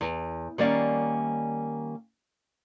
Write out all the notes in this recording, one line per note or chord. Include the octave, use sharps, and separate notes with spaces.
E2
D#3 G3 A#3 C#4 D5 F5